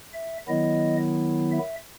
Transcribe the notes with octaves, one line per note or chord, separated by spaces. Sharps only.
E5
D#3 F#3 B3 E4 D#5
E5